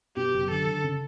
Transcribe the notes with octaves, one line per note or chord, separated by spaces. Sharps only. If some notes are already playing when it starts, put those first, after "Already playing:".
B2 G4
F#1
D3 A4
D3
C#3